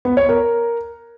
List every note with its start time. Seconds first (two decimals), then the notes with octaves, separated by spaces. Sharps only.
0.05 B3
0.17 C#5
0.29 A#4